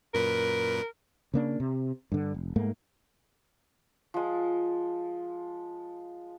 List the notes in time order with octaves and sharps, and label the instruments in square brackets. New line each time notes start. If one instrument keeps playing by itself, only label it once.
[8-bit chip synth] F#2 A#2 B4 [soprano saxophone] A#4
[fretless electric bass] C#3 A#3 D4
C3
G2 D3
F1
G#2 A3 A#3
[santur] F3 G#3